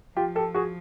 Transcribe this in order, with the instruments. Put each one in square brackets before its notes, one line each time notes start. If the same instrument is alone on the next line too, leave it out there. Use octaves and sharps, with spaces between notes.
[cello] F3 [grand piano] F4 G4
[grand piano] G4 A4
F#4 G#4